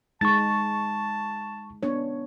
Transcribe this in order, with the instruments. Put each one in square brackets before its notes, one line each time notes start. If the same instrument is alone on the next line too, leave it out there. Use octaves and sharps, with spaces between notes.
[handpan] G#3 D#4 [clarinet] A5 [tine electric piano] C#6 A6
[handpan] B3 D4 C#5